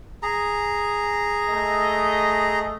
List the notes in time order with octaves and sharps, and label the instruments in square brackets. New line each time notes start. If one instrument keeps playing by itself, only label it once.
[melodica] G#4 A#5
[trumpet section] A3 D#5